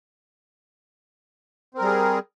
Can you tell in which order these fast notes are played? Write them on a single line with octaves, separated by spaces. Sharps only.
C4 A#4 G3 G#4